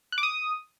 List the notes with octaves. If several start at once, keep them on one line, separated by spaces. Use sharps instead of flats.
F#6
D6
D#6